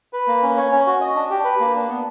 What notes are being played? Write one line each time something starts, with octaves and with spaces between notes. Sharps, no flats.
B4
A#3
C#4
C#5
C#4
F#4
D#5
D4
G4
B4
A#3
D4
B3